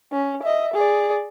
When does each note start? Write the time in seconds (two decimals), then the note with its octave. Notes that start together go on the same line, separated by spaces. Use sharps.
0.12 C#4
0.43 D#5 E5
0.74 G#4 D5